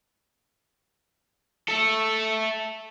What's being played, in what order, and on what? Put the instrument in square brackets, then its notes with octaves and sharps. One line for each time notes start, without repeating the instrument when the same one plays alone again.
[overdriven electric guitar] A4 E5